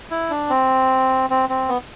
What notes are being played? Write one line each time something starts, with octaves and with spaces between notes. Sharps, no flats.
E4
D4
C4
C4
C4
B3